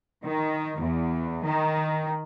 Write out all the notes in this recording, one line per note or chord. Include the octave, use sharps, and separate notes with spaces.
D#3
E2
D#3